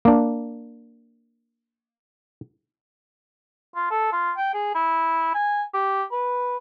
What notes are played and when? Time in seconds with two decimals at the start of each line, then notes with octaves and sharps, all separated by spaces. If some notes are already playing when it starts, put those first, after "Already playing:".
0.05 A#3 D4
3.76 F4
3.91 A4
4.12 F4
4.37 G5
4.54 G#4
4.75 E4
5.35 G#5
5.74 G4
6.12 B4